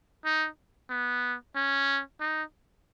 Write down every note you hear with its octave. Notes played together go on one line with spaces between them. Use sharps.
D#4
B3
C#4
D#4